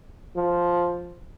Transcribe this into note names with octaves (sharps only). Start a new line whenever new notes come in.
F3